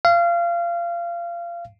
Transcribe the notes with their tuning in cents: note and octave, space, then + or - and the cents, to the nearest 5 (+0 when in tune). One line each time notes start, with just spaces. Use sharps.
F5 -25